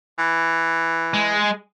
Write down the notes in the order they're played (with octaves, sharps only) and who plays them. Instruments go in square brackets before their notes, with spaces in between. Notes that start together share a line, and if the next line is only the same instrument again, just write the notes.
[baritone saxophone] E3
[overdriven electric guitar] G#3